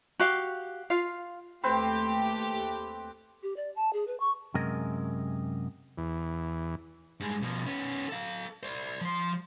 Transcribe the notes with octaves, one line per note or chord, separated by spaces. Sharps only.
F#4 G4 F5
F4 F5
D#2 A3 C4 G4 B4 C5
G4
D5
A5
G#4
B4
C#6
F#2 C3 G#3 A#4 D#5
E2
G2 G#3
B2 F3
B3 C#4
A4 F5
C5 D5
F3 C6